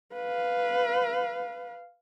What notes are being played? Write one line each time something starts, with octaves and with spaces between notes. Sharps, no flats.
B4 F5